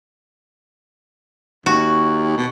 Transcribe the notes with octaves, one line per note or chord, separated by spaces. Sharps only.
D#2 F#4
B2